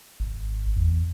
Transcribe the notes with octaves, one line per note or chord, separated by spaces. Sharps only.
G#1
E2